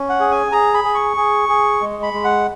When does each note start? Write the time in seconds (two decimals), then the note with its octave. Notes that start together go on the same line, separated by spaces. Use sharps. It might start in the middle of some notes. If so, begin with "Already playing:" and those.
Already playing: C#4
0.09 F#5
0.20 G#4
0.31 G#5
0.52 G#4 A#5
0.74 B5
0.84 G#4
0.95 C#6
1.17 G#4
1.49 G#4
1.81 G#3
2.03 B5
2.13 G#3
2.24 F#5